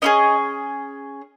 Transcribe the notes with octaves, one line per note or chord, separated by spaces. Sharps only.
C#4 E4 G#4 D#5